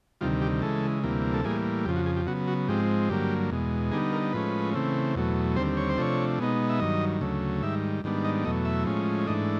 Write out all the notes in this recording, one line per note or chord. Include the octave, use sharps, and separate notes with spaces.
D2 C3 D#3 G3 F4
G4
C#3 E3 G#3 A4
D2 C3 E3 G3 A#3
A4
A2 E3 G3 A#3 G#4
F2 C#3 F3 G4
F#4
G#4
G4
C#3 F#3 B3 F#4
F#4
G#2 F3 G#3 C4 G4
G2 D3 F#3 A#3 G4
E2 B2 G#3
D3 G3 B3 D#4 G#4
A#4
A2 F3 G#3 C#4 B4
C#3 E3 A3 C4
E2 B2 F#3 A3
D#2 D3 G3 C4 C5
C#5
C5
C3 F3 A3 D4 C#5
B2 G#3 B3 D#4
E5
G2 D#3 F#3 D#5
D2 C#3 F#3 A3
G#2 D#3 G3 E5
G#2 D#3 G3 B3 D4
D#5
E2 B2 F#3 A3 D#5
E5
A2 F3 G#3 C#4
G#2 E3 A3 D4 D#5